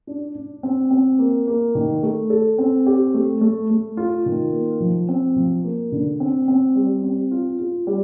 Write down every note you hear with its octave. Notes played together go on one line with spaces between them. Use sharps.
D4
D4
C4
C4
A#3
A#3
D#3
A3
A4
C4
G4
A3
A3
A3
F4
D#3
A#3
F3
C4
F3
A#3
D3
C4
C4
G3
C4
F4
F4
G3